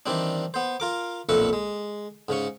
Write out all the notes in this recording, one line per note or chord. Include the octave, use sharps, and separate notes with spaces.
D#3 E3 G3 C4 D4
B3 C5
F4 A#4 D6
B1 F2 A#2 B4 E5 C#6
G#3
G#2 C#3 C#4 C#6